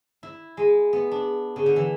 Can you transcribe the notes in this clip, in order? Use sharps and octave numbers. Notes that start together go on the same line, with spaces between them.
E4
G#3
B3
D4
C#3
D3
E3